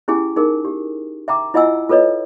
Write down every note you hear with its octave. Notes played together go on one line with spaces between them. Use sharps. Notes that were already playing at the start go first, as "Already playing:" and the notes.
C#4 E4 G4 G#4 G#5
D#4 G#4 A#4
G4
E5 G5 A#5 D6
E4 F4 D#5 F#5 G#5 E6
F4 A4 B4 C#5 D#5